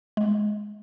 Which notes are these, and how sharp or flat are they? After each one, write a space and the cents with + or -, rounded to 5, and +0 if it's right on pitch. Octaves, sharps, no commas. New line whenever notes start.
G#3 +15